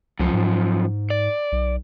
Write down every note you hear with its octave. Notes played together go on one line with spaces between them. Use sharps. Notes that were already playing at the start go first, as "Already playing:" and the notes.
C#2 F#2 F3
G#2
D5
B1